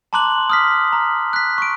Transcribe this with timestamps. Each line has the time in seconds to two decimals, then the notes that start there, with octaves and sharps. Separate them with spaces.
0.13 A5 A#5 C6 D6 F#6 F#7
0.50 D#6 F6 B6
0.93 A#5
1.33 F#6 B6
1.58 C#6 D7